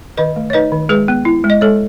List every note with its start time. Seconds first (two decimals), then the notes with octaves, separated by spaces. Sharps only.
0.17 D#3 B4 D#5
0.36 A3
0.50 C#5
0.53 D#4 B4 D#5
0.72 D#3
0.89 G#3 G#4 B4
1.08 B3
1.25 E4
1.44 G#3
1.50 D#5
1.61 G#3 A4 C#5